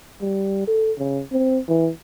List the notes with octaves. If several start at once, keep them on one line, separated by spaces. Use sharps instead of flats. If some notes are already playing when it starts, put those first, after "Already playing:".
G3
A4
C#3
C4
E3